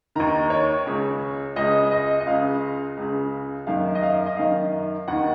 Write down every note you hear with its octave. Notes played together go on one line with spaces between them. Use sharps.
D#2 D#3 A#5
C#5
C#2 C#3
C#2 C#3 D#5
D#5
D#5
C#2 C#3 F5
C#2 C#3
F#2 D#3 F5
D#5
F5
D#5
F#2 D#3 F5
D#2 D#3 F#5